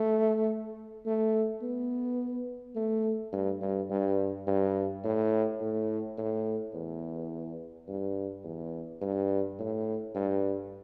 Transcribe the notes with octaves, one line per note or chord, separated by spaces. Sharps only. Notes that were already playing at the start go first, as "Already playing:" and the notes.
Already playing: A3
A3
B3
A3
G2
G2
G2
G2
A2
A2
A2
E2
G2
E2
G2
A2
G2